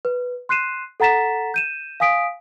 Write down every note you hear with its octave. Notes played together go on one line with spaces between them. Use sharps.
B4
C6 F#6 C7 D#7 E7
A4 F#5 A#5 A6 B6 E7
G6 D#7 E7
F5 G#5 D#6 B6 D7